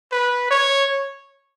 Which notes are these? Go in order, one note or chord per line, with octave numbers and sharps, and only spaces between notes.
B4
C#5